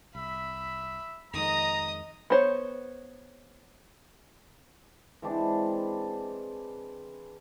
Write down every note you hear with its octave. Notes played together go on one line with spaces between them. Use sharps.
C2 E5 B5
F2 D#3 G#3 D#5 A#5 D#6
B3 C5 C#5
E3 G#3 C4 D4